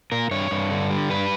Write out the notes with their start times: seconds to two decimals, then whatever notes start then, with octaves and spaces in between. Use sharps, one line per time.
0.12 A#2 A#4
0.31 G2 C#5
0.51 G2
0.71 D3
0.90 G3
1.10 G2 B4